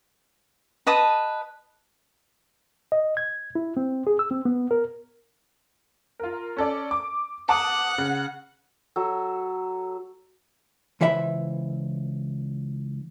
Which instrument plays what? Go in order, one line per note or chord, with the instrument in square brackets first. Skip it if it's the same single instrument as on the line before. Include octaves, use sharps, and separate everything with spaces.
[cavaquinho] B4 D#5 A5 D#6
[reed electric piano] D#5
G#6
E4
C4
G#4
E6
C4
B3
A#4
[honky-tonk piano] F4 A#4
C#4 A4 D5
D6
[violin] F#5 [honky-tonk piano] A5 D6 D#6
[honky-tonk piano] C#3
[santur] F#3 A4
[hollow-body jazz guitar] C#2 E3 C5 E5 B5